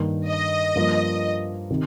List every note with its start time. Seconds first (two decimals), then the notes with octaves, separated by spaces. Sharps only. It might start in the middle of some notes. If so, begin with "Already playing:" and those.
Already playing: G2 D#3 A#3
0.29 D#5
0.75 G2 F3 A#3 F4
1.71 C3 D#3